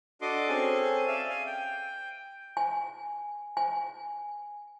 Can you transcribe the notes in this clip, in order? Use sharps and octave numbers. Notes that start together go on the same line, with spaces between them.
D4 F#4 A4 D#5 C6 D6
C4 C#4 G#4 A4 G#5
D5 E5 F5
F5 G#5
G5
G#5
G#5